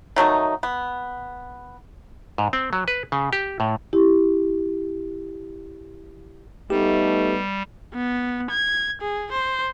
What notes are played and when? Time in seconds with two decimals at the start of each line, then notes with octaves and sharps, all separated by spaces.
0.16 D#3 F#3 A3 D#4
0.63 B3
2.38 G#2
2.53 C4
2.73 F#3
2.88 B4
3.12 C#3
3.33 G4
3.60 A2
3.93 E4 G4
6.70 G3 A3 B3 D#4 G4
7.94 B3
8.51 G#6
9.02 G#4
9.32 C5